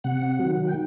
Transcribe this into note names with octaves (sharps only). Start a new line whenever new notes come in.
C3 F#5
D#3 F#3
G5